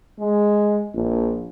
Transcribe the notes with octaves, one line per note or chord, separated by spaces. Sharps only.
G#3
A#1